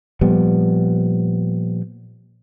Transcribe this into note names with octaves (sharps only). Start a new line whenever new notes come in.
A#2 F3 G3 B3